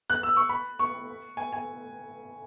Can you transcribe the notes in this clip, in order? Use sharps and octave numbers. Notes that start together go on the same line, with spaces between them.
F#6
E6
C#6
B5
C#6
G#5
G#5